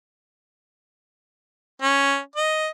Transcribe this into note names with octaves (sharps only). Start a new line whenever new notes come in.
C#4
D#5